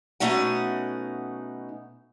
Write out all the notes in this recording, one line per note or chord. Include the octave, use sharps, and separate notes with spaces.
B2 A3 C#4 D#4 F#5